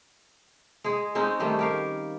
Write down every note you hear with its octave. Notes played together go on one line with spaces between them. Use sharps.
G#3 G#4
G#3 C4 C#4 D#4
D#3 G3 A3
G4 A#4 F5